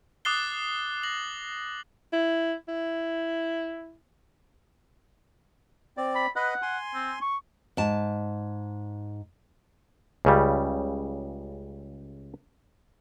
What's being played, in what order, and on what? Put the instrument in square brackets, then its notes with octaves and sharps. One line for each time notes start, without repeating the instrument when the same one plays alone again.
[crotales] D6 D#6 F#6 A6 C7 G7
A#6 F#7
[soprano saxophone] E4
E4
[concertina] C4 D5
[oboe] B5
[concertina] B4 D#5 B5 [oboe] F#5
[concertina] G#5 C6
[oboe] C4
C#6
[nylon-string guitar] G#2 A5
[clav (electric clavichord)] C#2 C#3 G3